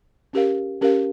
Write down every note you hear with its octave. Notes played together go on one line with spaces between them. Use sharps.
C#4 G4 A#4 F5
C#4 G4 A#4 F5